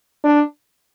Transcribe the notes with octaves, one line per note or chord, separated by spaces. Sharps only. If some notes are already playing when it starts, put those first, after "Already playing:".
D4